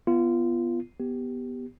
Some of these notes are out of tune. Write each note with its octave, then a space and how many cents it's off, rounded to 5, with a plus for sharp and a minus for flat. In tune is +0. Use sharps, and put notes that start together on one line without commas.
B3 +0 F4 -25
B3 +0 G4 +0